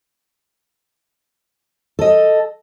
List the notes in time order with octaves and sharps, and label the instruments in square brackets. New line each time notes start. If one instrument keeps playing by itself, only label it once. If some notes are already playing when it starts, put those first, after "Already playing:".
[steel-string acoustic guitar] A4 D#5